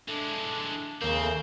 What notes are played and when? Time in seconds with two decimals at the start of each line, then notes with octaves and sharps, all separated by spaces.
0.08 E3 G#3 A3 D4
1.01 D#2 C#3 A#3 C4 G6
1.21 A3